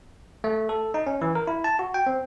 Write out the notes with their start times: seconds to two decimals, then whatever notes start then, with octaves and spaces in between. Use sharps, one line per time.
0.44 A3
0.69 A4
0.94 D#4
1.06 C#4
1.22 E3
1.35 A#4
1.47 E4
1.64 A5
1.79 F#4
1.94 G5
2.07 C4